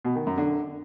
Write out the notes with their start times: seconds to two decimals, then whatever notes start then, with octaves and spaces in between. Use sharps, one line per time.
0.05 B2
0.16 D#3
0.27 F#2
0.38 D3